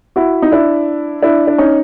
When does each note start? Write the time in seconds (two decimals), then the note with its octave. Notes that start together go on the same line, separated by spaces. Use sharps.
0.16 E4 F#4
0.42 D#4
0.51 D4 E4
1.22 D4 E4
1.47 D4
1.58 C#4 D#4